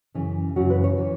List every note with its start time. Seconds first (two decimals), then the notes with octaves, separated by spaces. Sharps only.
0.14 F#2 C#3 E3
0.56 F#2 C#3 E3 F#4
0.70 B4
0.84 C#5
0.97 E3